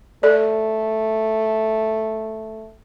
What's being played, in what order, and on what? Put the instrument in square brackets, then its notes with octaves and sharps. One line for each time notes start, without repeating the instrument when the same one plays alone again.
[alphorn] A3 [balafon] A4 D5